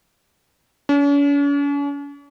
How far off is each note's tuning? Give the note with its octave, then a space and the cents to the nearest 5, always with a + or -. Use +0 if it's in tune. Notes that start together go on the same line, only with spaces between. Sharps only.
C#4 +45